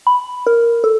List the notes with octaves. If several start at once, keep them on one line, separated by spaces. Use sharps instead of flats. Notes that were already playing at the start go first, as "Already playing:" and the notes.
B5
A#4
A4